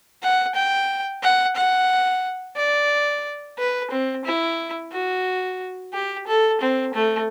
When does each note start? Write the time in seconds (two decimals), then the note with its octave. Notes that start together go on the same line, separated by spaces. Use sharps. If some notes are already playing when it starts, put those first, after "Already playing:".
0.23 F#5
0.55 G5
1.23 F#5
1.56 F#5
2.57 D5
3.59 B4
3.91 C4
4.25 E4
4.92 F#4
5.93 G4
6.28 A4
6.61 C4
6.95 A3